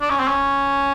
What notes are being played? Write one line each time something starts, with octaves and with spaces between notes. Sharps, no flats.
D4
C#4
C4
C#4